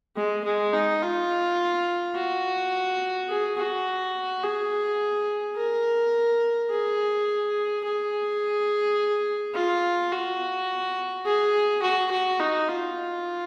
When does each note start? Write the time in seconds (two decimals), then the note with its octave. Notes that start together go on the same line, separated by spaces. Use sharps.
0.17 G#3
0.45 G#3
0.73 D#4
1.02 F4
2.15 F#4
3.29 G#4
3.58 F#4
4.43 G#4
5.57 A#4
6.70 G#4
7.85 G#4
9.55 F4
10.12 F#4
11.26 G#4
11.82 F#4
12.11 F#4
12.40 D#4
12.68 F4